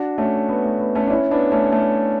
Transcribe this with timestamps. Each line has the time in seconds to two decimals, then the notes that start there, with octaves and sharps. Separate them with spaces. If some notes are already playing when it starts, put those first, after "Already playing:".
Already playing: D4 F#4
0.18 A3 C#4
0.49 B3
0.64 A3
0.80 B3
0.95 A3 C#4
1.07 D4
1.10 C#4 E4
1.31 B3 D4
1.52 A3 C#4
1.72 A3